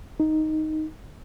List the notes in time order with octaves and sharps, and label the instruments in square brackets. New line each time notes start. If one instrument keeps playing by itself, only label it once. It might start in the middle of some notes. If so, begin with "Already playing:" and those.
[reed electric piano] D#4